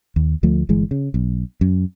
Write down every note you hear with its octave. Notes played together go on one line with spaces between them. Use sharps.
D#2
D2 F3 A3
G1 E3 G#3
C#3
B1
F#2